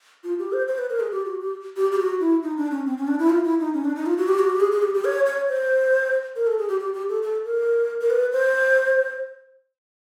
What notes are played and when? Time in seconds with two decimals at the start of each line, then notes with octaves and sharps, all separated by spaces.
0.24 F4
0.39 G4
0.52 C5
0.68 C5
0.78 B4
0.89 A#4
1.00 G#4
1.12 G4
1.25 F#4
1.40 G4
1.77 G4
1.92 G4
1.99 F#4
2.20 E4
2.43 D#4
2.57 D4
2.71 C#4
2.86 C4
2.98 C#4
3.07 D4
3.19 E4
3.29 F4
3.44 E4
3.59 D#4
3.74 C#4
3.84 D4
3.95 D#4
4.06 F4
4.18 F#4
4.28 G4
4.39 F#4
4.50 G4
4.60 G#4
4.72 G#4
4.82 G4
4.94 G4
5.05 C#5
5.26 C#5
5.48 C5
6.36 A#4
6.47 A4
6.58 G#4
6.68 G4
6.80 G4
6.93 G4
7.09 A4
7.22 A4
7.45 A#4
8.01 A#4
8.10 B4
8.32 C5